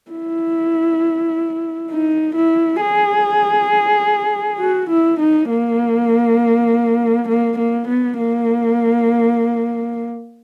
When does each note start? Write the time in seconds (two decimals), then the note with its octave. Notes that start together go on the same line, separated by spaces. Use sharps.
0.11 E4
1.91 D#4
2.35 E4
2.81 G#4
4.60 F#4
4.90 E4
5.20 D#4
5.50 A#3
7.29 A#3
7.59 A#3
7.88 B3
8.18 A#3